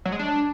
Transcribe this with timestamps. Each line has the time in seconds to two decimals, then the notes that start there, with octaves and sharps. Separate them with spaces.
0.05 F#3
0.12 G#3
0.19 D4